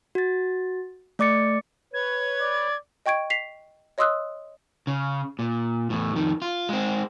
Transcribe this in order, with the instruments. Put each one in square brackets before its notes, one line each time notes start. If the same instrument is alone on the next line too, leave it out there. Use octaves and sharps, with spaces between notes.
[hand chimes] F#4 A6
A3 D5 D6 A6 C#7
[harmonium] B4 C#5 [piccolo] G#6
[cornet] D5
[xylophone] D#5 G5 C#6 G#6 D7
B6 C7 F7
C#5 D#5 C6 D#6 E6 F#6
[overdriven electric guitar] C#3
A#2
E2 A2
F2 D#3
F4
G#3 C4